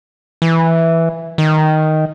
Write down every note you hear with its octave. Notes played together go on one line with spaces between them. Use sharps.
E3
D#3